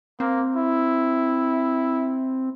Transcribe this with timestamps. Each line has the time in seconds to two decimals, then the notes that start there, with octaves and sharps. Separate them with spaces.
0.20 A#3 C4
0.57 E4